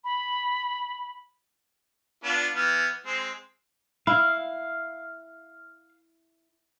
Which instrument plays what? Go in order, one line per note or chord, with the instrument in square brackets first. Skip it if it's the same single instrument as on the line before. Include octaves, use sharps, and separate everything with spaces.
[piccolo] B5
[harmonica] B3 D4 F4
E3 B3 F6
G#3 C4
[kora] E4 [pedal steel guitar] F5